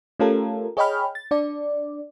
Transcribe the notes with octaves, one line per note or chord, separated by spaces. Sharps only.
A3 C#4 F4 G4 A4 A#4
G#4 C#5 D#5 G5 B5 F6
A6
D4 D5